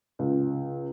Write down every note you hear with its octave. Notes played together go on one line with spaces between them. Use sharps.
C#2